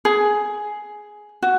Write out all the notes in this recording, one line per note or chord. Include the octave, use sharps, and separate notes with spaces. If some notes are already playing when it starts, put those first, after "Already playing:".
G#4
F#4